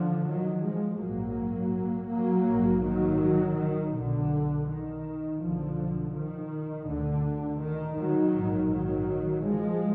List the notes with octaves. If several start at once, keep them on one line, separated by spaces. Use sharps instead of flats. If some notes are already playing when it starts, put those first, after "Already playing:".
Already playing: D3 F3
D#3 F#3
F3 G#3
A#1 G#2 F#3 A#3
F#3 A#3
A#1 G#2
D#3 F#3
D#3
B1 B2 D3
D#3
B1 B2 D3 F3
D#3
D2 D3
D#3
D#3 F#3
A#1 G#2
D#3 F#3
F3 G#3